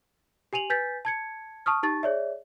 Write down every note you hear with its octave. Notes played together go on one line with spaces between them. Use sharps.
G4 G#5 D#7 F7 F#7
B4 G#5 G6 A6 B6
A5 G#6 C#7
A5 C#6 D#6 F6
D#4 G4 A5 C#6 A6
G#4 C#5 D5 E5